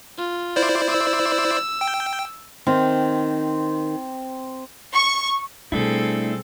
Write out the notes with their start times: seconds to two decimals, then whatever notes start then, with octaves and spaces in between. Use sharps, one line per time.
0.18 F4
0.56 E4 C5 D5
0.88 E6
1.81 G5
2.67 D#3 C4
4.93 C#6
5.72 B2 G3 A3 C4 D4 E4 G#4 A4